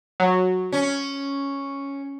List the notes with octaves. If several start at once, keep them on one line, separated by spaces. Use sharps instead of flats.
F#3
C#4